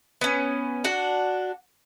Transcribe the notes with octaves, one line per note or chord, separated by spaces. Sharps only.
B3 C#4
D4 F#4 F#5